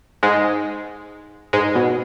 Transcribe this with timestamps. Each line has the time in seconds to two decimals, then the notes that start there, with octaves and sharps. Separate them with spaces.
0.23 G#2 G#3
1.53 G#2 G#3
1.75 B2